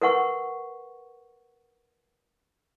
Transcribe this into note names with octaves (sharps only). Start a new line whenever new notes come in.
A#4 B4 F#5 C#6